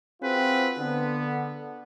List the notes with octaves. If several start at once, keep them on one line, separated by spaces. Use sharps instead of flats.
C4 F4 F#4 G#4 B4
D3 B3